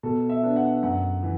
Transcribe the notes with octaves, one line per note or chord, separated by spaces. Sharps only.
B2 A4
E5
B3 D4
F#5
F#2 F#5
E3